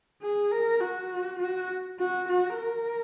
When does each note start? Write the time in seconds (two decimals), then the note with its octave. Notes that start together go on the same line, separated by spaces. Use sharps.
0.22 G#4
0.51 A#4
0.80 F#4
1.40 F#4
1.99 F#4
2.28 F#4
2.58 A#4